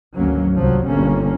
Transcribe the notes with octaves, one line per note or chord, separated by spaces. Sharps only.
G#1 D2 F#3 A#3 C#4
G1 C2 C3 F3 F#3
G1 B2 D3 G3 A#3 C#4